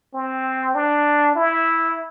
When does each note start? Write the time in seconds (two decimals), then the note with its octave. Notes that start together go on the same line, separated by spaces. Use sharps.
0.14 C4
0.75 D4
1.36 E4